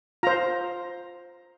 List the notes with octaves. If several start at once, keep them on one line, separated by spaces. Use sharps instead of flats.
F4 C5 A#5